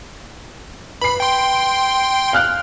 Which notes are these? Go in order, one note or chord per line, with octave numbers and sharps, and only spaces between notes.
B4 B5 C7
G5 C6
F5 F6 F#6